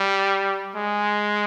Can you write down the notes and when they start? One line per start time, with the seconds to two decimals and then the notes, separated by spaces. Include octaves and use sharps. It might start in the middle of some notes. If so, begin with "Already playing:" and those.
Already playing: G3
0.76 G#3